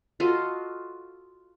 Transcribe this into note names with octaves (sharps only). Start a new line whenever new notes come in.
F4 F#4 A4 D#5